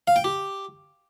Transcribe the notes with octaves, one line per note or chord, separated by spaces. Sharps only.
F5
G5
G4